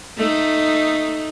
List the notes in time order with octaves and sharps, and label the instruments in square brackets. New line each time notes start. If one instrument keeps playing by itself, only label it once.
[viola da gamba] A3 D#4